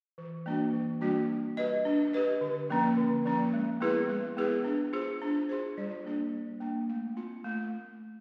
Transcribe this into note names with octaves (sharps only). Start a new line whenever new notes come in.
E3
G3 A#3 D4 F#4
E3
G3 A#3 D4 F#4
D4
G4 B4 D#5
D4
G4 B4 D#5
D3
F3 A#3 C#4
D3
F3 A#3 C#4
G#3
B3 E4 G#4 B4
G#3
B3 E4 G#4 B4
D4
F4 G#4 C5
D4
F4 G#4 C5
G3
A#3 D4
G3
A#3 D4
A3
C4 F4
A3